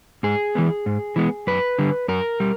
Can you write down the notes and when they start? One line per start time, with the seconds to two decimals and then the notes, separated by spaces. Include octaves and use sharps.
0.23 G#2 G#4
0.55 E3 G#3 B3
0.86 G#2
1.16 E3 G#3 B3
1.47 F#2 B4
1.79 D3 G3
2.08 F#2 A#4
2.40 G3